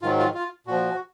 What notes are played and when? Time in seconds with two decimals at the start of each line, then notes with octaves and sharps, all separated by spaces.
0.02 G#2 D#3 F#3 F4
0.19 F4
0.34 F4
0.67 A#2 F3 F#4